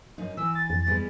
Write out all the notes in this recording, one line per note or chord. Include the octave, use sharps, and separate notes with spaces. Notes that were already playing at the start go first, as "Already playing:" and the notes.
F#2 D#4
E3 E6
A6
F2
G3 G#3 B3